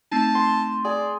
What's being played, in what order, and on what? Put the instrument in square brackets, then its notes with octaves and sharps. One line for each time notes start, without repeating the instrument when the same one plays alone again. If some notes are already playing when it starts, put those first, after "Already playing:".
[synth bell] A3 C4 D#4 [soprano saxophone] A5
[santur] C6
[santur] G#4 [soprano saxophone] D5